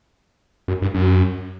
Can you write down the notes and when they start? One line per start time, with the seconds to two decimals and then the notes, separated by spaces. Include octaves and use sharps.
0.68 F#2
0.82 G2
0.94 F#2